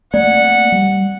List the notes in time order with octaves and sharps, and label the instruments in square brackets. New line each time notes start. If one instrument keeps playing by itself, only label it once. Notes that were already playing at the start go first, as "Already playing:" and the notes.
[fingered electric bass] A3 A#3 C4 [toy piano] D5 [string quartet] F#5
[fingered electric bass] G3